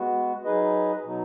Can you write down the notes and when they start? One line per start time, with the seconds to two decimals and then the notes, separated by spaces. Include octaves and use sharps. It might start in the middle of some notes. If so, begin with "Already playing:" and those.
Already playing: G#3 B3 F#4
0.44 F#3 D#4 G#4 B4 D#5
1.04 B2 F#3 D#4